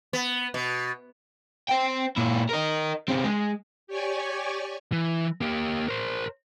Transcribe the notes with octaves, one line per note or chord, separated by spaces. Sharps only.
B3
B2
C5 G5
A#2 E4
A#4 D#5
C#3 C4
G#3
G4 C#5 D5 G#5 C#6
E3
A#3 G4
A#4 C5